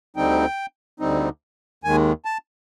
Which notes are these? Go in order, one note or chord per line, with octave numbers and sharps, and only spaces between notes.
D2 D3 G3 C4 D#4 G5
D2 D3 G3 C4 D#4
D#2 D#3 G#3 G#5
A5